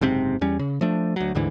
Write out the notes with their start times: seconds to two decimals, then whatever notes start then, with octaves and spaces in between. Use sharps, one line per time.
0.01 F#1 G#2 C3 C4
0.41 E2 G3 C#4
0.59 C#3
0.81 F3 A3 D4
1.16 D2 F#3
1.35 D2 G#2 D3 E3